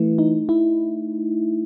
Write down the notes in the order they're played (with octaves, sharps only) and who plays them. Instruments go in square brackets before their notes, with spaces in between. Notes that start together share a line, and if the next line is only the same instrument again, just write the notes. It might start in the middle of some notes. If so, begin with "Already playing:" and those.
Already playing: [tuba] E3 [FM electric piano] A3
[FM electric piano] D#4
E4